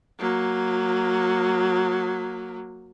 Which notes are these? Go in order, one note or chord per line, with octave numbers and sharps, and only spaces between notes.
F#3 A#3